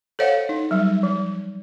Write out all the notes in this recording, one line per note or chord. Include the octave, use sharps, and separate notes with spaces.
A4 C5 C#5 D#5 F5 F#5
D#4
F#3 G3
F3